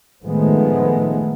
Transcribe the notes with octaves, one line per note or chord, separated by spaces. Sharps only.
A2 D#3 F3 G#3 A3 B3